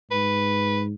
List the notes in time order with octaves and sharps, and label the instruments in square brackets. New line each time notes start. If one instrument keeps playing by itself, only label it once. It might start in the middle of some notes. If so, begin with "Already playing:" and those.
[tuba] G#2 [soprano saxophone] B4